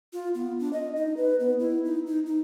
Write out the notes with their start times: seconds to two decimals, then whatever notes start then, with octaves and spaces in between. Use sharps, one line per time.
0.13 F4
0.35 B3
0.60 D4
0.73 D#5
0.96 D#4
1.17 B4
1.40 B3
1.60 E4
1.85 D#4
2.06 D#4
2.26 D#4